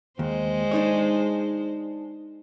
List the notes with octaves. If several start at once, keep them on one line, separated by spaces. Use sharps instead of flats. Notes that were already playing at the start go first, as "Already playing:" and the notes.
D#2 G#3 C5
D4 D#4 C#5